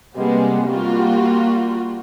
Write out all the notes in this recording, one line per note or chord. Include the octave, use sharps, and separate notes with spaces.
C3 G3 G#3 A#3 B3
G3 A#3 F4 F#4